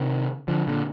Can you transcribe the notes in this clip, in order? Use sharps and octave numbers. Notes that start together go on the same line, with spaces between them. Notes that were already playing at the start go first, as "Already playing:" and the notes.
Already playing: C3 D#3
D3 F3
A#2 D3